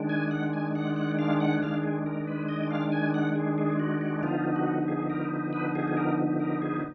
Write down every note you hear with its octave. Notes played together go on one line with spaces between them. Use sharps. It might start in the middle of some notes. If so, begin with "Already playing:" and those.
Already playing: D#3 G#3 D4
G#5
F#5
G#5
F#5
F#5
F5
F#5
D#3 G#3 D4 F5
G#4
A#4
B4
D#5
F5
G#5
F#5
G#4
G#4
F#4
F#4
D3 F3 B3 D#4 F4
F#4
G#4
A#4
B4
G#4
G#4
A#4
A#4
G#4